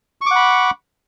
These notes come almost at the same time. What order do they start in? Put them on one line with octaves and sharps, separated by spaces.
C#6 D6 F#5 B5